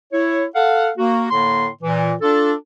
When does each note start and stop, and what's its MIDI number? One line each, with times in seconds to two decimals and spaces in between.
0.13 0.45 64
0.13 0.45 73
0.55 0.90 69
0.55 0.90 77
0.55 0.90 78
0.98 1.27 58
0.98 1.27 66
1.31 1.68 45
1.31 1.68 50
1.31 1.68 58
1.31 1.68 84
1.83 2.14 46
1.83 2.14 52
2.22 2.53 62
2.22 2.53 65
2.22 2.53 69